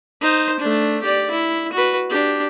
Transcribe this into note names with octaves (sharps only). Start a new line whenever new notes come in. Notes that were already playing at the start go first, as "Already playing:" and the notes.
D#4 C5
A3 D4
G4 D5
E4
F#4 B4
D4 G4